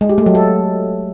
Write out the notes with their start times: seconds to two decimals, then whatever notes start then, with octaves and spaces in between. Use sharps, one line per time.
0.01 G#3
0.09 G4
0.18 A3
0.26 F#3
0.35 A4